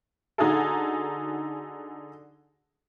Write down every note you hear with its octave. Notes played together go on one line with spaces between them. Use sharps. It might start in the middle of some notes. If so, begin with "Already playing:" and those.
D3 D#4 F#4 G#4 A4